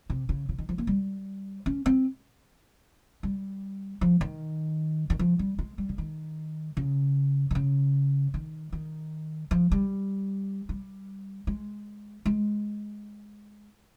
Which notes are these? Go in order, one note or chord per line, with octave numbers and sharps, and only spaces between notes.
C3
C#3
C#3
D#3
F3
A#3
G3
C#4
C4
G3
F3
D#3
D#3
F3
G3
G#3
G3
C#3
D#3
C#3
D#3
C#3
D#3
D#3
F3
G3
G3
G#3
G#3